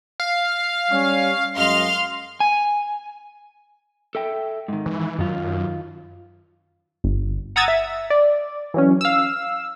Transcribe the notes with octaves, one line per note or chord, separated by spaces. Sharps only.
F5
G3 C#4
F#2 G#3 D#5 F5 C6 F6
G#5
A4 E5 G5
G#2 D#3
E3
F#2 D#3 F4
G1
F#5 A#5 D#6 E6 G#6 A6
E5
D5
E3 F#3 C#4
F5 E6